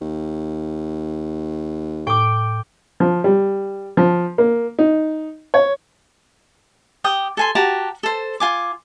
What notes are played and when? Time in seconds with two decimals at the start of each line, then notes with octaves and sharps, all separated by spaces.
0.01 D#2
2.07 A2 G5 D6
3.00 F3
3.24 G3
3.97 F3
4.38 A#3
4.79 D#4
5.54 C#5
7.04 G4 G5 D#6
7.37 A4 G#5 C6
7.55 F#4 G4 A5 A#5
8.03 A4 C5
8.40 F4 G#5 D6